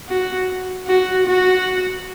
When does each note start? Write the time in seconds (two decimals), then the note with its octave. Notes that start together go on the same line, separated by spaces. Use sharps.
0.09 F#4
0.87 F#4
1.26 F#4